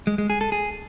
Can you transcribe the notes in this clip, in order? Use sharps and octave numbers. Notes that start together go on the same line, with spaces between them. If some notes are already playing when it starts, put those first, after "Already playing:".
G#3
G#3
G#4
A4
G#4